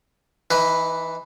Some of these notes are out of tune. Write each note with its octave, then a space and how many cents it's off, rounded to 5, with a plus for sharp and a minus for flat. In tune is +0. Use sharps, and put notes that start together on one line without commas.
E3 +0 D#4 +30 B4 +0